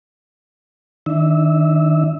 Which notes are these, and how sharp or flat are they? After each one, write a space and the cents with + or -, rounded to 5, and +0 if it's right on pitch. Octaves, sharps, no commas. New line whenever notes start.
D#3 +5 D4 +0 E5 -15